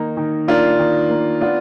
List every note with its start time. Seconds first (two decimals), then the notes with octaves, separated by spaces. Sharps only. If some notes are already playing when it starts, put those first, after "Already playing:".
Already playing: D#3 A#3 D#4
0.17 D#3
0.48 A#3 D4 F4
0.79 D#3
1.09 A#3
1.41 B3 D4 F4